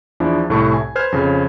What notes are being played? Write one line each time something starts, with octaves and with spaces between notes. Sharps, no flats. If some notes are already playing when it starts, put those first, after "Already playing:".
E2 F3 D4 E4
C2 A2 A3 E4 A5 C#6
G#5
B4 C5 F6 G#6
F2 C#3